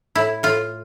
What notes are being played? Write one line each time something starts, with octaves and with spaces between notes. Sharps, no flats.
A2 E4
A2 F4